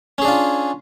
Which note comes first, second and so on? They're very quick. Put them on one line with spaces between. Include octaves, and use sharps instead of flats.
C#4 G#4 D4 F4